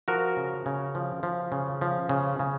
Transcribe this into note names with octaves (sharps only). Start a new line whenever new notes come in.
F3 F#4 A#4
C#3
C#3
F3
F3
C#3
F3
C#3
C#3